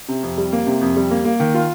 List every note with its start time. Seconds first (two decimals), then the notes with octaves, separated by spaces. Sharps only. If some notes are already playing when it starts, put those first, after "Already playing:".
0.08 C3
0.23 F2
0.38 G3
0.53 A#3
0.66 C3
0.81 F2
0.96 G3
1.11 A#3
1.25 A#3
1.40 D#3
1.54 F4